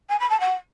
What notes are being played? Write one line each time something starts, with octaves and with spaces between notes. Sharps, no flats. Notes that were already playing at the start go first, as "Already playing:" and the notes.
G#5
B5
A5
F#5